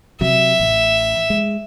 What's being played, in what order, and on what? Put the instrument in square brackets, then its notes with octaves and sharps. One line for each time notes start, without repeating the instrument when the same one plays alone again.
[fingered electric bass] C3 F#3 [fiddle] E5
[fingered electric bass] A1
G#3